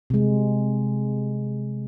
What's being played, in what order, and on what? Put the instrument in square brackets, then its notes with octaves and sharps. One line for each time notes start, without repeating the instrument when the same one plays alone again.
[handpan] C3 G#3